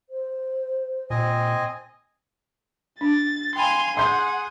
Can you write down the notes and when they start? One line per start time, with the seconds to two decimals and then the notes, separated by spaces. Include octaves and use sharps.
0.09 C5
1.10 A#2 C4 D#5 G#5
3.01 D4 A6
3.56 F5 G5 G#5 B5 C6
3.97 G#4 F#5 C6 G6